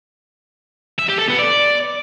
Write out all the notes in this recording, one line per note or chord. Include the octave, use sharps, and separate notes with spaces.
E5
G4
A4
B3
D5